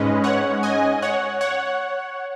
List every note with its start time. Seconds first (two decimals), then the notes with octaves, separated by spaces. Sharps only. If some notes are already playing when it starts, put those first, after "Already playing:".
Already playing: G#2 G#3 C#4 B4 D#5
0.24 C#5 F#5
0.63 D#5 G#5
1.02 C#5 F#5
1.41 C#5 F#5